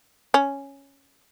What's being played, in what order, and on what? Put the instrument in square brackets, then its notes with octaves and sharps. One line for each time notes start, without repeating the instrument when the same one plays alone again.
[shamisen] C#4